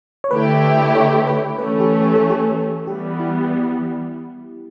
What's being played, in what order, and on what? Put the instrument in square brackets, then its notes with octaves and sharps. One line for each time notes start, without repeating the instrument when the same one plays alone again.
[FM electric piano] C#5
[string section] D3 A3 E4 G4 [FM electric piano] B4
[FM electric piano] C#5
B4
[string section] E3 A3 C#4 [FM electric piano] B4
[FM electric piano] G4
G4
A4
G4
[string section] E3 G3 B3 [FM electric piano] G4
[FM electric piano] E4